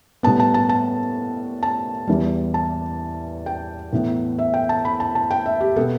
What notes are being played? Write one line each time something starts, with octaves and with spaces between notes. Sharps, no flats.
A2 G3 B3 A5
A5
A5
A5
A5
E2 E3 G3
A5
G5
A2 E3 B3
E5
G5
A5
B5
A5
A5
G5
E5
G4
B2 B3 A4